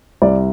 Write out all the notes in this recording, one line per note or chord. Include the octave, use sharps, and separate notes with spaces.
C2 D5